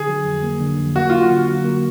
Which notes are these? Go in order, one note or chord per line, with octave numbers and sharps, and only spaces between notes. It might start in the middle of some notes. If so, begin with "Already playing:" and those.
Already playing: D3 G#4
F#3
F2
A#3
D3
F2
A#3 F#4
F#3 F4
F#4
D3
F#3
A#3